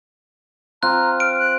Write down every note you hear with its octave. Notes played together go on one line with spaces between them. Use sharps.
C4 F4 A#5 F#6
F6 D7
F#6